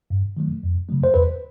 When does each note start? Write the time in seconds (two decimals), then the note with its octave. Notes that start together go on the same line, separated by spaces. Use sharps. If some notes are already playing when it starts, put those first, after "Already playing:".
0.10 G2
0.37 D#3 F#3 A3
0.63 F2
0.89 C#3 F#3 A3
1.04 C5
1.14 E2 B4